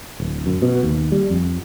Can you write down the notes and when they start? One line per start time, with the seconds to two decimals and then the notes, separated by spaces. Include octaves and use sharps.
0.20 D1
0.46 F#2
0.62 B2
0.83 D#2
1.12 G3
1.30 F2